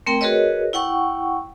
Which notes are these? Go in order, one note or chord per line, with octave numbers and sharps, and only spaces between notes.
A3 C4 A#4 G5
F#4 G#4 A#4 B4 C#5 D#5
E4 F#5 G5 C#6